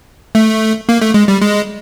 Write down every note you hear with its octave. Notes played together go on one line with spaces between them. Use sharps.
A3
A#3
A3
G#3
G3
G#3